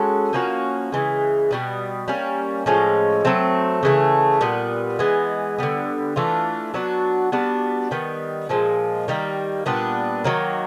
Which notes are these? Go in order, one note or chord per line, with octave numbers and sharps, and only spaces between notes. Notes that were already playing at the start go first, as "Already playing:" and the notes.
Already playing: G#3 C#4 F#4 A4
F3 A#3 C#4 F#4
C#3 E3 G#3
B2 G3 B3
G3 A#3 C#4
A2 F3 G#3 C#4
F#3 A3 C4
C#3 E3 A3
A#2 G3 B3
E3 G#3 B3
D3 G3 B3
E3 A3 D4 F4
F#3 B3 D4 F#4
G3 B3 D4 F#4
D#3 G3 B3
A#2 F3 G#3
D#3 G3 A#3
A#2 G3 B3 D4
D#3 F#3 A#3